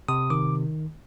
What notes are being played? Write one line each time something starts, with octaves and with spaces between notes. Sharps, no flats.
C3 D#6
D#3 D6